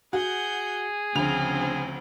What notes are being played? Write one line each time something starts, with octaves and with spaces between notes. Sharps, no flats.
F#4 G#4 F#5 G6
D2 C#3 F3 C4 F7